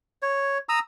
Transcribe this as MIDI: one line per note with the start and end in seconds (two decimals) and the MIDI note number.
0.22 0.58 73
0.69 0.79 82
0.69 0.79 87
0.69 0.79 88